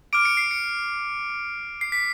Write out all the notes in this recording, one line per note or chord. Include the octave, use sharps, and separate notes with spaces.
D6 F6 D7
C#7
C7
C#7
C7
B6